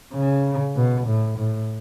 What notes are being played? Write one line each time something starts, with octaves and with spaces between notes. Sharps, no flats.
C#3
B2
A2
A2